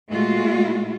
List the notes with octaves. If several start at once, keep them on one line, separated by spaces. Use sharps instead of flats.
A#2 G#3 A3 F4 F#4